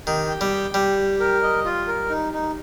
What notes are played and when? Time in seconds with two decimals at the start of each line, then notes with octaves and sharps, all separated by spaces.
0.07 D#3 G4
0.29 G5
0.41 G3
0.52 G4
0.74 G3 G4
0.98 G4
1.20 A#4
1.43 D#5
1.65 F4
1.87 A#4
2.09 D#4
2.33 D#4